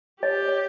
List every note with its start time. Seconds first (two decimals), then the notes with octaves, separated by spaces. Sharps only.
0.22 G4 C#5 D#5
0.48 C#5